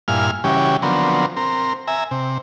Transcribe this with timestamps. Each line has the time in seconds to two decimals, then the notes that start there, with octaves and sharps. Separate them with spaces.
0.08 G2 A#2 E4 F5 G#5 F6
0.44 C#3 E3 G3 C#4 F#4 G4
0.82 D3 F3 F#3 B3 C4 A#4
1.37 C4 A#4
1.87 E5 G#5 A#5
2.11 C3